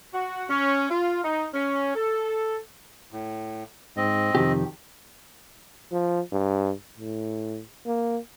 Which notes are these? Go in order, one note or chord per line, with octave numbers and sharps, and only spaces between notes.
F#4
C#4
F4
D#4
C#4
A4
A2
G#2 C4 D#5
F2 C3 D#3 G4
F3
G2
A2
A#3